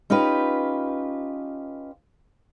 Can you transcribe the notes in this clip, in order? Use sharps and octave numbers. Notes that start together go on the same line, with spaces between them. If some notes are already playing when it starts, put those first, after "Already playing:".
C#4 D#4 F4 G4 B4